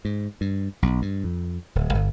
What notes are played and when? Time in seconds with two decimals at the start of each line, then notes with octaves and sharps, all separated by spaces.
0.05 G#2
0.41 G2
0.82 B1
1.02 G2
1.24 F2
1.75 D1
1.95 G1